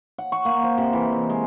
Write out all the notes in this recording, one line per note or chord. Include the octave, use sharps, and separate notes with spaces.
F#5
C#6
A#3
C5
C3
E3
D#5
G#3